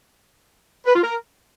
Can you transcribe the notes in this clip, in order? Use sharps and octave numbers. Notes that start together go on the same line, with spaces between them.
B4
F4
A#4